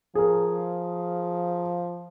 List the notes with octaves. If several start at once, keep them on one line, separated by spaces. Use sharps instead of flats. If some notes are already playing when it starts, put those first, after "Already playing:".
F3 G#4 A#4